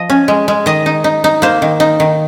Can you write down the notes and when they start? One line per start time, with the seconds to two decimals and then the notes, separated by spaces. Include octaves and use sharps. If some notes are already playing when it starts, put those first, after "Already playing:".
Already playing: F3 D#5
0.10 C#4
0.28 G#3
0.48 G#3
0.66 D#3 D#5
0.86 D#4
1.04 D#4
1.24 D#4
1.42 A#3 C5
1.62 D#3
1.80 D#4
2.00 D#3